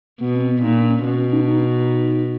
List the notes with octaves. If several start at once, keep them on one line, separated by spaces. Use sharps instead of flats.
B2 B3
C4
B3
A#2 D#4
D4
C#4
B2
C#4
D#4
D4
D#4